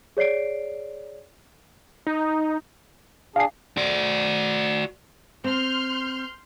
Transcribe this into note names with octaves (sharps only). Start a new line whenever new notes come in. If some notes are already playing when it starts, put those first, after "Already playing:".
G#4 C#5 D5 C7 D7
D#4
D4 G#4 F5 C7
F#4 D5
C4 C6 F6 G6